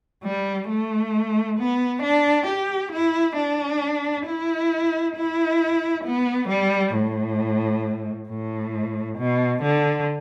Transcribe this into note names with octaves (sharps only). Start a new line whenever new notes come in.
G3
A3
B3
D4
G4
E4
D4
E4
E4
B3
G3
A2
A2
B2
D3